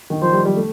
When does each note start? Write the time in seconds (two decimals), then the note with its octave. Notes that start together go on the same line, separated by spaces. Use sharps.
0.10 D#3
0.22 F3 C5
0.33 G3
0.45 G3
0.57 A3